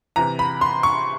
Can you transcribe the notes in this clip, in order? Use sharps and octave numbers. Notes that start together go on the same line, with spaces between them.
C3 E3 A#5
B5
C6
C#6